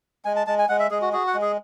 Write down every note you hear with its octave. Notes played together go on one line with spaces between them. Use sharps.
G#3 G#5
A5
G#3 A5
G#5
G#3 F#5
E5
G#3 G#4
F#4
F#4 G#4
F#5
G#3
G#4